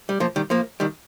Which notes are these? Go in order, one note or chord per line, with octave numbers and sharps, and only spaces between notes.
G3
F3 A#3
D#3 G3
F3 A#3
D#3 G3